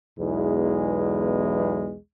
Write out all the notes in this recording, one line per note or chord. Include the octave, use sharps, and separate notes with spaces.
B1 E2 E3 G#3